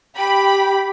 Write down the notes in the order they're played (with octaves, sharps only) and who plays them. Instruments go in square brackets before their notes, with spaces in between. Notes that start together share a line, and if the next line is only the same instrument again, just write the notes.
[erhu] G4 [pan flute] G5 [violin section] B5